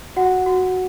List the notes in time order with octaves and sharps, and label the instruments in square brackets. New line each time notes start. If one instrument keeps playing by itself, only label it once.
[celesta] F#4 F#5
F#4